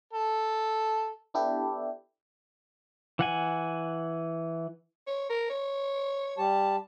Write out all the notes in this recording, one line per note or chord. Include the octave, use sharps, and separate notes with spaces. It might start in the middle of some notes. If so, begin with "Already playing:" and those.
A4
B3 D4 E4 G4 A4
E3 F#5 G#5
C#5
A#4
C#5
G3 G4 A5